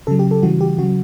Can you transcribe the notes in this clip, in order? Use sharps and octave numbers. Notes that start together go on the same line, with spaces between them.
C#3 F#3 A4
G4
A4
C#3 E3 G3 F#4
G4
C#3 F#3 F#4